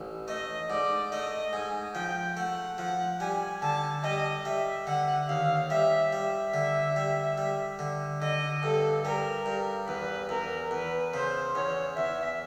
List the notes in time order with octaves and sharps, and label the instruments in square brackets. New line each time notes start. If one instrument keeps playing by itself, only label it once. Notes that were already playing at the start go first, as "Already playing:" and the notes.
Already playing: [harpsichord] A1
[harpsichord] A3 [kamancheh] D#5
[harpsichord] G#2 [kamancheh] D5
[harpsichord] A3 [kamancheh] D#5
[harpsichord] G#2 [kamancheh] G#5
[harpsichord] F3 [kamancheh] G5
[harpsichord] A3 [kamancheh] F#5
[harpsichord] F3 [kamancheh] F#5
[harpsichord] G3 [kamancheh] G#5
[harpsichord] D3 [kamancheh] A5
[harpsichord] G3 [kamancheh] D#5
[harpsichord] G3 [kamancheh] E5
[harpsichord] D3 [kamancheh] F#5
[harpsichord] D#2 [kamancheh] F5
[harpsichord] G3 [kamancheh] E5
[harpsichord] G3 [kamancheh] E5
[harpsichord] D3
G3
G3
D3
[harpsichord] D3 [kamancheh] D#5
[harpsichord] G2 [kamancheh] A4
[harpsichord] G3 [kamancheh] A#4
[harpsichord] G2
[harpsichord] E2 [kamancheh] B4
[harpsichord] E2 [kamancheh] A#4
[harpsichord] E2 [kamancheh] B4
[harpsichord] C#3 [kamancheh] C5
[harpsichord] E2 [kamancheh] C#5
[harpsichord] E2 [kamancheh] E5